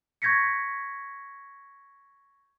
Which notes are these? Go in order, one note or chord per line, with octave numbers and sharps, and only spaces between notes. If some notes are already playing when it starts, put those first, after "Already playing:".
C#6 G6 G#6 A#6 B6 C#7